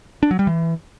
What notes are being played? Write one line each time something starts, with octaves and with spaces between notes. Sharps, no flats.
D4
F#3
G3
E3